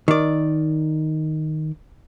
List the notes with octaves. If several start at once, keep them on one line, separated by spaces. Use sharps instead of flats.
D#3 D5